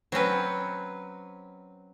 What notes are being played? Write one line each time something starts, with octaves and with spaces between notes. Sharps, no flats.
F#3 C4 C#4 B4